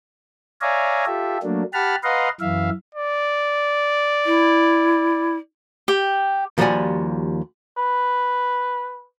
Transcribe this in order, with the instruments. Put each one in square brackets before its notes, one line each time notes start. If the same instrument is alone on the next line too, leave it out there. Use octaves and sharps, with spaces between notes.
[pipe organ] C#5 D5 E5 F5 G#5 A#5
F4 G4 A4 E5
F#3 A3 A#3 D4
G4 F#5 A5 B5 F6
B4 D#5 F5 F#5 A#5 C6
F#2 E3 E5 F5
[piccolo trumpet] D5
[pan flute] E4
[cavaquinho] G4
[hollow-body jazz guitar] D#2 F3 G3 F#4 D5 G#5
[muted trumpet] B4